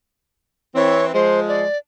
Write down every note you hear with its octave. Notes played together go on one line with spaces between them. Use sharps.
E3 C4 C#5
F3 G#3 C5
D5